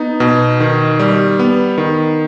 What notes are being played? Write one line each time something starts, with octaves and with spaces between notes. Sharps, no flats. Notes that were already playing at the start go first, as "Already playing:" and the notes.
Already playing: B3 D#4
B2
D#3
G3
B3
D#3